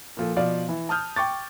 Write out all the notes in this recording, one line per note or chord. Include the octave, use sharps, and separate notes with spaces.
A#2 F3 A4
B2 F3 D5 F5
E3
A5 D#6 F6 G6
G5 C#6 D6 A6